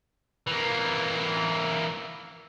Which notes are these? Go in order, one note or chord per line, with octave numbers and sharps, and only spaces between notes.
E3 A#3